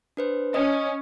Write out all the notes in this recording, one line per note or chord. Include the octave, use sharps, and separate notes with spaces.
D4 B4 C5
C#4 D#5 D#6